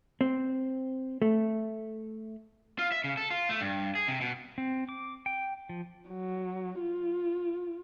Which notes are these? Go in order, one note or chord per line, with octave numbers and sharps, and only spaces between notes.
C4
A3
F4
E5
C#3
A4
F4
A3
G2
G#4
C3
B2
C4
D6
G5
F3
F#3
F4